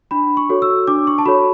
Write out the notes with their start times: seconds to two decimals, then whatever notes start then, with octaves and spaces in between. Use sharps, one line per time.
0.11 D4 B5
0.37 C#6
0.49 F#4 A4 C#5
0.62 E6
0.87 D4 D6
1.07 C#6
1.18 A5
1.26 F#4 A4 C#5 B5